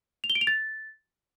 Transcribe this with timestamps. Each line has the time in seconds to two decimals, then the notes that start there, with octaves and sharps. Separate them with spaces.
0.24 F7
0.30 G7
0.35 D7
0.41 F7
0.47 A6